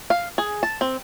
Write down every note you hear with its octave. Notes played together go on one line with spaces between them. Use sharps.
F5
G#4
A5
C4